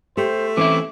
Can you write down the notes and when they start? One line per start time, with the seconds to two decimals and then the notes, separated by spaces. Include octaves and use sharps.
0.17 A3 G4 C5
0.57 E3 C4 C#4 E4 D6